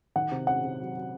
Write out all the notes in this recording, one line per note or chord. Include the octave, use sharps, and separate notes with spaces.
D#3 F#5
C3
C#4 F#5
C3
F#3
F#3